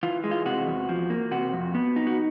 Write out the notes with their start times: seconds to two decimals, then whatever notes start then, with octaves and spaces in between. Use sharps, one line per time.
0.03 E3 F4
0.24 G#3
0.31 F4
0.45 C3 F#4
0.67 E2
0.89 F3
1.10 A#3
1.31 C3 F#4
1.53 F2
1.75 B3
1.96 D#4
2.07 F#4